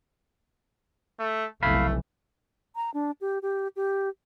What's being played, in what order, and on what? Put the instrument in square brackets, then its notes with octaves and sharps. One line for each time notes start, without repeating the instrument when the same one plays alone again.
[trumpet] A3
[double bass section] F1 B1 E3 [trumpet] A3 [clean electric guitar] F5 B5
[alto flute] A#5
D4
G4
G4
G4